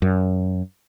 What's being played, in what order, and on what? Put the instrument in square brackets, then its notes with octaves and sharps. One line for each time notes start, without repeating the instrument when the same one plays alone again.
[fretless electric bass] F#2